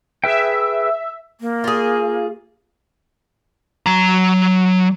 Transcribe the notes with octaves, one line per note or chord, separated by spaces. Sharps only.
G#4 B4 E5 G5
A#3
F4 G#4
F#3 A#5